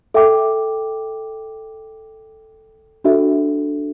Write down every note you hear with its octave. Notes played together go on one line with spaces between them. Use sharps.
A4 E5 G5 D6
D4 F#4 A4 E5